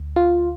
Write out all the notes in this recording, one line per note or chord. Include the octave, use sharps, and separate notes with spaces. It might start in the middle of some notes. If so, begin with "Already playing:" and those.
Already playing: D2
F4